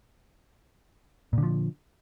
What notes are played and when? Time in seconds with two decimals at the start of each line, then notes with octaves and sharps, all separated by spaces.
1.33 A#2
1.38 D3
1.43 F3